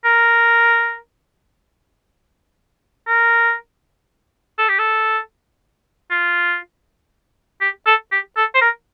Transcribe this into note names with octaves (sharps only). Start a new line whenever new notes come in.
A#4
A#4
A4
G4
A4
F4
G4
A4
G4
A4
C5
A#4